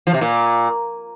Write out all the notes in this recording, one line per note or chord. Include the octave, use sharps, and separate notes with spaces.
F3
C3
A#2